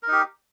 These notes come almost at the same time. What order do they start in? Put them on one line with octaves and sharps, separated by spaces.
A#4 D#4 G4